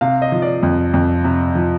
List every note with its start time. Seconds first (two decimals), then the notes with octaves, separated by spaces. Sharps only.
0.01 C3 F5
0.22 D#5
0.32 F3
0.42 D5
0.63 F2
0.94 F2
1.24 C3
1.55 F3